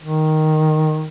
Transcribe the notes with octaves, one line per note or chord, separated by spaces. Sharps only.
D#3